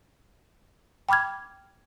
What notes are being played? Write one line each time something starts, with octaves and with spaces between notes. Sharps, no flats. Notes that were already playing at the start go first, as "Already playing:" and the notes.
G5 B5 D6 F6 G#6